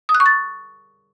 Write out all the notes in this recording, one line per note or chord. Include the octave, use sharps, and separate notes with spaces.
D#6
F#6
C#6
A6